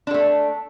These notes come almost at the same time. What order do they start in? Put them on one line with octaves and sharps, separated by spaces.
D4 A4 A3